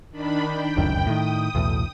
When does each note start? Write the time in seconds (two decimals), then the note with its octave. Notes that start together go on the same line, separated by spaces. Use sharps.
0.11 D#3 D4 B5
0.44 G5
0.77 F1 C#2 F#2 G5
1.07 A2 D#3 D#6
1.55 B1 E2 A2